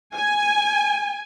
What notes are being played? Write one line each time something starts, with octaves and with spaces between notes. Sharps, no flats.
G#5